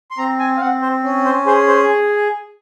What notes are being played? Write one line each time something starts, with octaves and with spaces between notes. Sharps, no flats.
C6
C4 A#5
G#5
F5
C4 F#5
C5
C#4
C5
G#4 C5
C5